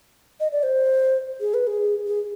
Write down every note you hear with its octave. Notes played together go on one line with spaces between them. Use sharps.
D#5
D5
C5
G#4
B4
G#4
G#4